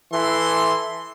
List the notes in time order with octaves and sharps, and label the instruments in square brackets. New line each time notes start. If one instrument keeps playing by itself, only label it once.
[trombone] E3 [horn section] A4 C6